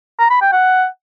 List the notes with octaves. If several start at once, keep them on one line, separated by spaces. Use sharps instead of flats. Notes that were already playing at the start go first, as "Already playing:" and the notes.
A#5
B5
G5
F#5